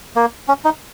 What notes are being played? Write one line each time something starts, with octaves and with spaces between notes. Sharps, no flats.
A#3
C#4
D#4